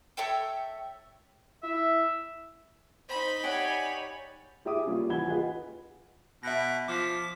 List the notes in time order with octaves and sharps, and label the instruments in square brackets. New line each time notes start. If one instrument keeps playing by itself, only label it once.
[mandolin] A4 C#5 E5 G5
[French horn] E4 [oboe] E5
[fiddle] D#4 B5 [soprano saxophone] C5
[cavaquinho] G4 D5 F#5 [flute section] C#5 [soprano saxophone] G#5
[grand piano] E4 G4 G#4 E5 D6 D#6
G3 A#3 C#4 F4
E3 F#5 G#5 B5 G#6 G7
F4 G4 G#4 B4 D#5 F#5
[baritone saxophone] B2 [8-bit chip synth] E5 A#6
[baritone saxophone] F3 [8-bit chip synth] D6 B6